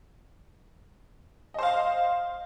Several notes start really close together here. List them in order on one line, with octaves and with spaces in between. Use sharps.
D#5 C5 F5